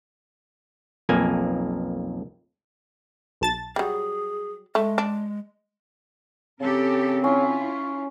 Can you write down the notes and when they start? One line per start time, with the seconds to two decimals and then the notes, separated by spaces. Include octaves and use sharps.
1.09 B1 F2 A#3 G#5
3.41 B1 A5 A6
3.76 F#3 G3 G#4
4.75 G#3 A3
4.98 D4
6.61 C#3 C4 G4 A4 A#4
7.24 C#4 E4 F4